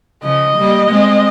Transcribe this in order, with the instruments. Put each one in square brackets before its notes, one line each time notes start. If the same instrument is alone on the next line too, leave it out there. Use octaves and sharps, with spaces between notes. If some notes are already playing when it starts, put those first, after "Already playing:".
[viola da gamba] C#3 F3 [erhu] D#5
[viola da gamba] G3 A#3
G#3 C4